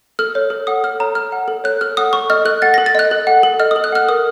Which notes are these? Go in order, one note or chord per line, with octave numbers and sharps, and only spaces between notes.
A4 F6
C#5
A4
F#5 D#6
A4 F6
C#5 A#5
A4 F6
F#5
A4
C#5 F#6
A4 F6
F#5 D#6
A4 C#6
D#5 F6
A4 F#6
F#5 A6
A4 A#6
A6
D#5 F#6
A4
F#5
A4
D#5 F6
D#6
A4
F#6
F#5 F6
A#4 D#6